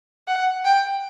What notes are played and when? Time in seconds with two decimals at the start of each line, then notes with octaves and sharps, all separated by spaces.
0.28 F#5
0.65 G5